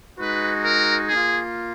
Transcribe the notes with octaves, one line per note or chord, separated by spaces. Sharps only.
G#3 D#4 F#4 B4
A#4
A#3 F4 G#4